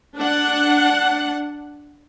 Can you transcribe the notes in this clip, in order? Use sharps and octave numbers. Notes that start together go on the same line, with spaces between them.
D4 F#5